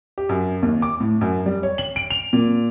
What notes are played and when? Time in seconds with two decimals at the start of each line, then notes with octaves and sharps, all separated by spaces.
0.18 G4
0.29 F#2
0.62 D#2
0.82 D6
1.00 A2
1.21 F#2
1.46 G3
1.63 C#5
1.78 F#7
1.96 D7
2.10 F7
2.33 A#2